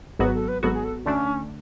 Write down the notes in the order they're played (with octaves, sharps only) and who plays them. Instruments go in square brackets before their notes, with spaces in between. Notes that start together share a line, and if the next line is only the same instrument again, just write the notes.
[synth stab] G#1 G#2 F#3 B3 F#4 [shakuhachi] B4
[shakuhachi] A4
B4
[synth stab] G#1 G#2 F#3 B3 F#4 [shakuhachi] A4
[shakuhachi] G#4
A4
[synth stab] D2 D3 A3 D4 [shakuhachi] C#4